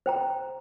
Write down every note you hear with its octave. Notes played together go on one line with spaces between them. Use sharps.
C5 G5 A#5